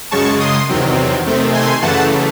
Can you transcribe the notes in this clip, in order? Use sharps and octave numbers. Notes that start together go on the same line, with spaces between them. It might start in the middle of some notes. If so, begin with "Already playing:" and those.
F#2 C#3 G#3 A5 C#6
C6 D#6
E2 C3 D#3 F#3 C4
C3 D#3 A3 C4
G#5 C6
F#2 C#3 E3 A3 F#5 A5